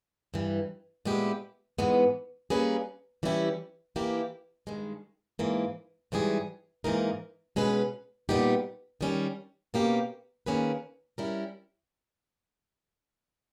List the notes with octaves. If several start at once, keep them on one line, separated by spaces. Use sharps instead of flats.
G2 E3 G3
A#2 G#3 B3 E4 G4
G#2 E3 G#3 B3
G3 A#3 C#4 G#4 B4
E3 G3 C#4 E4 G4
E3 A#3 E4 G4
G2 D#3 G#3
G#2 E3 A#3
G#2 E3 G3 C#4 G#4
G#2 E3 A#3 D#4 A#4
B2 G#3 C#4 G#4 B4
A#2 G3 B3 D#4 G4
D#3 G3 C#4
B2 A#3 C#4 G4
D#3 A#3 C#4 G#4 B4
G3 C#4 E4 A#4